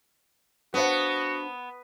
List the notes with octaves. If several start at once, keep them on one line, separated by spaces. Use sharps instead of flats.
B3 D4 F#4 C5 F5